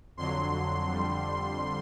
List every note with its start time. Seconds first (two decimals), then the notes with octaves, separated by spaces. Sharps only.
0.17 F2 D3 F#3 C6
0.90 F2 D3 G3